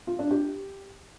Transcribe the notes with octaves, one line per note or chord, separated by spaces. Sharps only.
F4
D4
G4